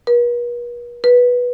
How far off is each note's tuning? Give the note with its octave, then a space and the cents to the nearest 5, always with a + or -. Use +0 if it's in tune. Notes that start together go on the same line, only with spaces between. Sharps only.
B4 -45
B4 -10